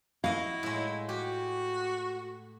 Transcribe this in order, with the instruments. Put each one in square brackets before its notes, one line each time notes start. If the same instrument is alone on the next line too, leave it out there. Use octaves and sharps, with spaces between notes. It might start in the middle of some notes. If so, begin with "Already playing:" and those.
[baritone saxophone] E4 [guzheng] F#4 D#5 [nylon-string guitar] F5
[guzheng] A2 G#3
[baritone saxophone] F#4 [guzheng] G4